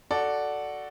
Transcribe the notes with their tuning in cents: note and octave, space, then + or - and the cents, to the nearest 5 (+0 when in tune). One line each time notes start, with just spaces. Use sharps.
F#4 +0 A4 +0 D5 +0